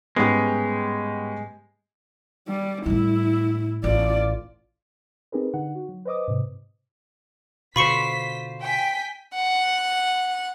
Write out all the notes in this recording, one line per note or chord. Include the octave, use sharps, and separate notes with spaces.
G#2 G3 G#3 B3 C#4 G4 D#6
G3
A2 G3 E4
A1 F4 D5
C4 D#4 G4 G#4 A#4 B4
D3 D#4 F#5
F#4
F#3
B4 C5 D#5 D6 D#6
G#2 C3
B2 D3 F4 C5 B5 C#6 B6 C#7
G5 G#5 B6
F#5